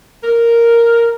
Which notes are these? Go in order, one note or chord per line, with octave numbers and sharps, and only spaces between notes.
A#4